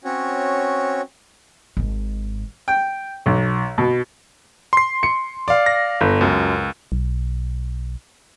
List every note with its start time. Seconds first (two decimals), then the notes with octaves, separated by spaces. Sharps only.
0.04 C4 C#4 F#4 C#5
1.77 G#1 G#2
2.68 G5
3.26 B1
3.78 B2
4.73 C6 C7
5.03 C#7
5.48 D5 F5
5.66 A#6
6.01 G1
6.21 C#2 F#2
6.92 B1